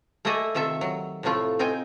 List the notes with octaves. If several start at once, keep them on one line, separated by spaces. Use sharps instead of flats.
A3 A#3 G#4 A4 D#5 E5
C3 D#3 F4 A4 E5
F#3
A2 C3 F3 A3 F4
C4 D#4 F4 G5 G#5